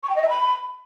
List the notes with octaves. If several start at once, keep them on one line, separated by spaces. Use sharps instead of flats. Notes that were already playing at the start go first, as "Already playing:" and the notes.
C#6
G5
D#5
E5
B5